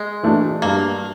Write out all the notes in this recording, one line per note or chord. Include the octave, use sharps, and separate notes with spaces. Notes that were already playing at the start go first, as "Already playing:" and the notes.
Already playing: G#3
E3 A3 D4 F#4
G2 A#3